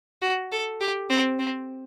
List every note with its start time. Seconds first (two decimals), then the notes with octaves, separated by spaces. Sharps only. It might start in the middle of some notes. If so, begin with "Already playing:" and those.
0.22 F#4
0.52 A4
0.81 G4
1.10 C4
1.39 C4